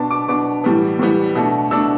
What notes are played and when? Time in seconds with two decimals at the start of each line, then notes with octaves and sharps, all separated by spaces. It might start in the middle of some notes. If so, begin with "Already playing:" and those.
Already playing: B2 B3 D4 A5
0.11 D6
0.28 B2 B3 D4 D6
0.64 A2 E3 G3 B3
0.99 A2 E3 G3 B3
1.35 B2 A3 D4
1.71 B2 A3 D4 E6